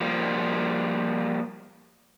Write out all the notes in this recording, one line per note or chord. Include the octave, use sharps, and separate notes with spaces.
F3 G3 A#3